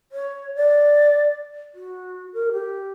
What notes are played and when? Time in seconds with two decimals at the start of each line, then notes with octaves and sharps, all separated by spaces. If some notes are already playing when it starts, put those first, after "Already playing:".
0.12 C#5
0.55 D5
1.74 F#4
2.33 A#4
2.52 G4